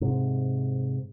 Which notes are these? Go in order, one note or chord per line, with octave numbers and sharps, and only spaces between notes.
G#2 C3